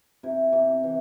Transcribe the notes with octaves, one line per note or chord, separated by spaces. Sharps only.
C3 E4
C3
E3